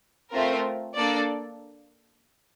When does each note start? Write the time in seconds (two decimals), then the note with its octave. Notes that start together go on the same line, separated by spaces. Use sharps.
0.32 A3 C4 F4 A#4
0.95 A#3 D4 A4 D5